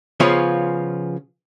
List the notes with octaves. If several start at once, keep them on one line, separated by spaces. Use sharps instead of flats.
C#3 F3 B3 C#4 F4 G#4